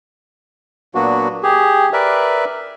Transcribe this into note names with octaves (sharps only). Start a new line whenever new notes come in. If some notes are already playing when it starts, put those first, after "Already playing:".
A#2 F#3 A#3 B3 D4 F#4
G4 G#4
A#4 B4 D5 E5